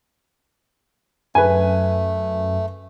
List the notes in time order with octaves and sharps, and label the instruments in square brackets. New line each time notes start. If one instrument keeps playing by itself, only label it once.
[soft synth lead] F#2 [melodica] A3 [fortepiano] B4 G#5